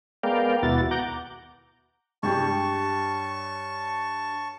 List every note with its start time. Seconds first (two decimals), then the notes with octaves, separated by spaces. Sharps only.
0.23 G#3 B3 A#4 D5 F5 G5
0.63 D#2 B2 B3 E4 F#4 A6
0.91 F#5 A#5 D6 G6
2.23 G2 G3 G4 C#5 A5 C#6